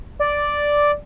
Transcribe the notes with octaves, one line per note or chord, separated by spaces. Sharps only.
D5